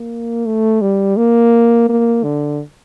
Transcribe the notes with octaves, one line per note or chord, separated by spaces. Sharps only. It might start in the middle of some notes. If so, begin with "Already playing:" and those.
Already playing: A#3
A3
G3
A#3
A#3
D3